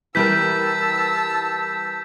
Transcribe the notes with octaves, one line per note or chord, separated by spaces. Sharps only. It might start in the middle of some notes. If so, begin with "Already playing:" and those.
E3 G3 A#4 A5 E6 G6 B6